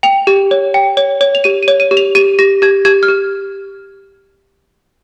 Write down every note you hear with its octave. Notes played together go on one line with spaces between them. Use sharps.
G5 F7
G4
C#5
G5
C#5
C#5
F7
G4 D#7
D#7
C#5
D#7
G4
F7
G4 D#7
G4 A#6
G4 G#6
G4 G#6
F6
G4